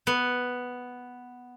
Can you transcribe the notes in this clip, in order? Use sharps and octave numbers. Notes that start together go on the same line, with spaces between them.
B3